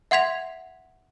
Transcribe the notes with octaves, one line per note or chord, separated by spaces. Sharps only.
E5 F#5 C6 G#6 B6 F7